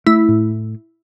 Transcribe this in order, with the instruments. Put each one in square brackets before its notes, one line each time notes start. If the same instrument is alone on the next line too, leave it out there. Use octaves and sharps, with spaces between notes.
[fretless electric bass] A3 [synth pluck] E4
[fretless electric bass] A2